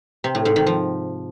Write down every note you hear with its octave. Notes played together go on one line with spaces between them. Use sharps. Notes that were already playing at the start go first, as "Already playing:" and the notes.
C3
A2
G#2
D#3
F3